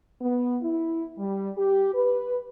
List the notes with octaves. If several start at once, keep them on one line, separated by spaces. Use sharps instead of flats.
B3
E4
G3
G4
B4